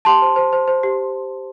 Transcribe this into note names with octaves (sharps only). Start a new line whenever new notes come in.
G4 A5 C6
C5
C5
C5
C5
G4